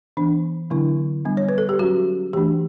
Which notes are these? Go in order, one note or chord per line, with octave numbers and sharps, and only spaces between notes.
E3 B3 D4
D3 F#3 B3 D4 E4
G3 B3 D4
C#5
B4
A4
G4
F#3 C#4 F#4
E3 A3 D4 G4